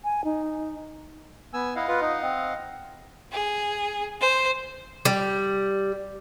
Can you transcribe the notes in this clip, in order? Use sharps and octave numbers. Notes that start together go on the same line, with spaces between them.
G#5
D#4
B3 G#5 E6
E4 D#5 F5 F#5
F4 B4
D#4
C4
G#4
C5
G3